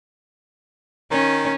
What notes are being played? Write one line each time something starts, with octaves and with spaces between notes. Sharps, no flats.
D#3 C#4